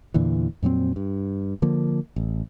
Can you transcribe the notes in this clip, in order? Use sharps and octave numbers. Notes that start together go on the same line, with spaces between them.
E2 A#2 D3 E3
F2 A#2 F#3 C4
G2
D3 F3 A#3
A1